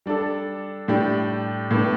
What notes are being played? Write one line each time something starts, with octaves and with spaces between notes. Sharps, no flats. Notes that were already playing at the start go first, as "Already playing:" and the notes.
G3 D4 A4
A2 G3 D4 G4
A2 G3 B3 D4